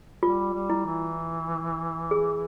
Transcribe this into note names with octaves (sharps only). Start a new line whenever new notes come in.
G3 F4
G3
E4
E3
G#4